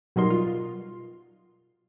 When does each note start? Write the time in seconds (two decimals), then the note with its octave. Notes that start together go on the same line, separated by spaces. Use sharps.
0.16 B2 F#3 G3 D#4 A#4 C6
0.30 F4